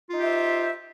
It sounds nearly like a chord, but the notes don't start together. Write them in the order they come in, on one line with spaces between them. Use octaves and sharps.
F4 D#4 G4 E5 C5